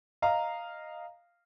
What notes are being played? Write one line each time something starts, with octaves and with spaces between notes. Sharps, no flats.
D#5 F5 A#5